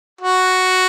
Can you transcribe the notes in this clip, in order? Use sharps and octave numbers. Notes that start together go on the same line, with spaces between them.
F#4